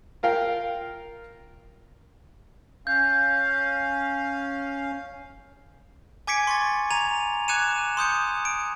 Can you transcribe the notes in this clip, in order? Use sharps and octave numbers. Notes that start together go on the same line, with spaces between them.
F4 A#4 F5 G5
C#4 F5 G6
G#5 D6 G#6 B6 C#7 D7
C6 C#6 G#6 A6
A#5 G#6 D#7 F7
D6 F#6 G#6 C#7 D#7 E7
C6 D#6 G6 C#7
D7